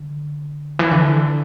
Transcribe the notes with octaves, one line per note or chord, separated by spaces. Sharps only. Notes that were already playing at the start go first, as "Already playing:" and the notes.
Already playing: D3
E3
D3